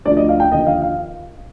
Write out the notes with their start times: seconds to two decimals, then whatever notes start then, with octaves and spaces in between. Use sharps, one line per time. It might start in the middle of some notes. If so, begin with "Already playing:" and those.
0.05 D2 D3 F3 D5
0.17 D#5
0.29 F5
0.40 G5
0.51 D#2 D3 F3 D#5
0.67 F5
0.82 F5